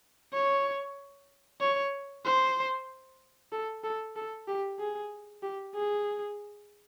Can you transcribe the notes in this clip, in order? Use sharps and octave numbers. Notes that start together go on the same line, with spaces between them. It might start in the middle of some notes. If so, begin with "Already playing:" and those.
C#5
C#5
C5
A4
A4
A4
G4
G#4
G4
G#4